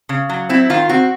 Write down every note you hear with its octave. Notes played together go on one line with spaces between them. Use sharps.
C#3
F#3
C4 E4
D#3 F4
C4 F#4